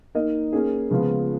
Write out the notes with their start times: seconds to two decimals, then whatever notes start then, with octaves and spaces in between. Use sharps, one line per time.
0.15 A#3 D#4 A#4 D#5
0.53 A#3 C#4 G#4
0.91 C#3 F3 G#3 B3 F4